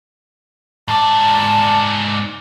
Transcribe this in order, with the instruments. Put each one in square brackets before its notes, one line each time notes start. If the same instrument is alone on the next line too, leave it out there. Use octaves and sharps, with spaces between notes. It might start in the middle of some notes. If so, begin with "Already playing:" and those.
[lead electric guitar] G#2 D5 [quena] A5